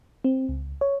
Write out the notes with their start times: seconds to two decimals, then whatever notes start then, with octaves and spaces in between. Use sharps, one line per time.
0.24 C4
0.49 C#2
0.81 C#5